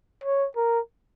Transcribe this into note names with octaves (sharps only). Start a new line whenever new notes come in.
C#5
A#4